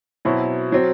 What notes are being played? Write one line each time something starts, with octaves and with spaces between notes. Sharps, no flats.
B2 F#3 C4 E4
F#3 C4